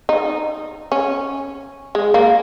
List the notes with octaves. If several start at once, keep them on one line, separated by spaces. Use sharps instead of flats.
D#4
C#4
G#3
A#3